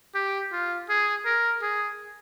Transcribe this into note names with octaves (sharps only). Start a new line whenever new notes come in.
G4
F4
G#4
A#4
G#4